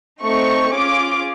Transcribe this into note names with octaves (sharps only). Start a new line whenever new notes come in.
A3 C4 D#4 C#6
C#4 F4 G#4 D6